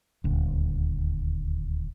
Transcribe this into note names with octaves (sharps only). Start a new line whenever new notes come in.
D#1 D2